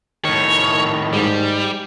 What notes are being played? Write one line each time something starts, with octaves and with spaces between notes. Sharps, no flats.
A2 D#3 C#5
G#2 G3